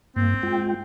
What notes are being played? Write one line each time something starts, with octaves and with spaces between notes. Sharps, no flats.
G2 A#3 C4
G#3 F4 G5